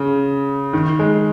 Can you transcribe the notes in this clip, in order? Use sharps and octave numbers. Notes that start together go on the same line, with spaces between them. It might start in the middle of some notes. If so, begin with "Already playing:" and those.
Already playing: C#3
D#3
G#3